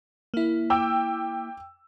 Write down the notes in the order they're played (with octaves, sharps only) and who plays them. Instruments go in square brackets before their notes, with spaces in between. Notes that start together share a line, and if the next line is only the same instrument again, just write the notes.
[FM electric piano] A#3 E4
[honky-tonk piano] G5 D6 E6